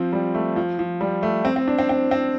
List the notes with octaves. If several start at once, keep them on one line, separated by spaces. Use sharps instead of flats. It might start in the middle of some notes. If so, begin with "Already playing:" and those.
Already playing: F3 C4
G3
A3
F3
F3
G3
A3
C4
C4
D4
C4
C4
C4